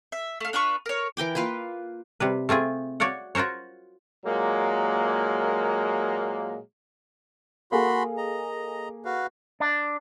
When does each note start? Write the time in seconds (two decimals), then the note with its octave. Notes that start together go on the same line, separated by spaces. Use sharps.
0.12 E5
0.40 A3 F5
0.53 D4 F4 B4 C#6
0.86 A#4 C#5
1.17 E3 A#4 G5 D6
1.35 A#3 F4 B4 F5
2.20 C3 G3 B4
2.49 A3 C4 F4 G#4
3.00 F#4 C#5 D5 F5 F#5
3.35 F4 F#4 A#4 C5 C#5
4.25 A#2 F#3 G#3 A#3
7.72 A#3 F#4 G#4 A4 B5 C6
8.17 D#5 A#5
9.05 F#4 B4 F5
9.60 D4